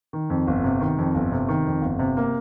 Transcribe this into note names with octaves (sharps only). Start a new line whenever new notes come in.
D#3
F2
G1
C3
D#3
F2
G1
C3
D#3
F2
G1
C3
A#3